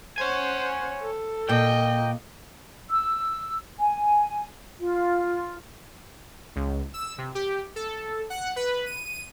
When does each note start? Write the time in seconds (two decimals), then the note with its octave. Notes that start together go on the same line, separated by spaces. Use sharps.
0.18 C5 C#5 F#5 G#5
1.01 A4
1.49 A#2 D#5 G5
2.90 E6
3.80 G#5
4.80 F4
6.56 C#2
6.94 E6
7.18 C3
7.35 G4
7.76 A4
8.30 F#5
8.56 B4
8.86 D#7